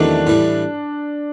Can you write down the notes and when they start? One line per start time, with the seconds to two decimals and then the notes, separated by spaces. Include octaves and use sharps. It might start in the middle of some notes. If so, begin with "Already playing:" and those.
Already playing: E2 C3 D#3 F#3 A3 D4
0.27 A2 E3 G3